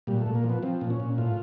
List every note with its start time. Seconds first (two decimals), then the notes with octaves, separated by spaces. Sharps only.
0.07 A#2 G3
0.21 A3
0.26 A#2
0.35 A#3
0.44 F3
0.49 B3
0.63 F3 C4
0.81 A#2
0.90 C#4
1.00 A#2
1.18 A2 F4